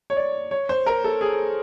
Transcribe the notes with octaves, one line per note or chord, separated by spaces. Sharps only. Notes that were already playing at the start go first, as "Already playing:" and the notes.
C#5
D5
C#5
C5
A#4
A4
G#4